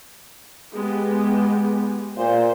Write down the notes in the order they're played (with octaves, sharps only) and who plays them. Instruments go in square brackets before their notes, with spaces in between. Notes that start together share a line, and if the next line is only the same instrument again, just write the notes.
[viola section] G#3 B3 G4
[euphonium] A#2 [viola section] C5